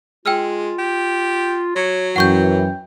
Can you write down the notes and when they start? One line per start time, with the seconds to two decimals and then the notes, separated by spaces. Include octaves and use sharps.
0.26 G#3 F4 G5 E6 F6
0.78 G4
1.76 F#3 C#5
2.16 F#2 E3 F#5 G5 C#6 G6